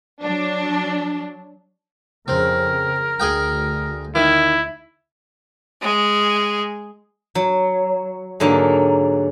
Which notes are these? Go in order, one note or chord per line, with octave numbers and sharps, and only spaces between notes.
F#3 D4
F2 C#3 C4 A#4
D2 G#4 D#5 G5
D#3 E4
G#3 G#4
F#3
G#2 D3 F#3 A#3